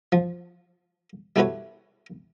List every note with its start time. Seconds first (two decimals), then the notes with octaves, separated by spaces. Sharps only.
0.12 F3
1.36 G3 A3 E4 F#4 B4 C#5